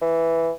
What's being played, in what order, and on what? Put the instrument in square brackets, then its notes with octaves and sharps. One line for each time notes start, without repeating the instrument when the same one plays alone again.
[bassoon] E3